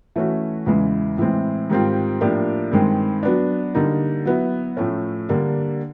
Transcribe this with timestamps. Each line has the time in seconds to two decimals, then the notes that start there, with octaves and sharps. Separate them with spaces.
0.16 E3 A3 C#4 F#4
0.66 E2 C#3 E3 G#3
1.18 A2 E3 G#3 C4
1.70 G#2 D#3 G3 C4 F4
2.21 A2 F3 A#3 D4 G4
2.71 G2 D#3 G#3 C4
3.23 F#3 B3 D4
3.75 D3 G3 A#3 D#4
4.25 F#3 B3 E4
4.77 A2 F3 A3 C#4
5.29 D3 G3 A#3 D4